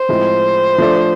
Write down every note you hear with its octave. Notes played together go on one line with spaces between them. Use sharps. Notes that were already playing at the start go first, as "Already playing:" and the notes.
Already playing: C5
A2 F3 G#3 C4
F3 A3 D4